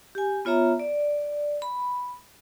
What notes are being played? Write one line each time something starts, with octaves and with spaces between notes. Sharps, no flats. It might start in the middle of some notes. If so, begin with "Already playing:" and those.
G4 G#5
B3 F4 C#5 E5 A#5
D5
B5